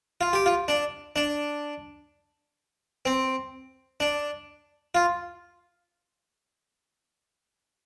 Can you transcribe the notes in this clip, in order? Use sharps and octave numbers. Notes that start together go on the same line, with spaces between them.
F4
G4
F4
D4
D4
C4
D4
F4